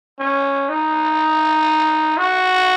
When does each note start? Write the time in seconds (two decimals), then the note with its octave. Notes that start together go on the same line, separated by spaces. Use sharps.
0.19 C#4
0.69 D#4
2.17 F#4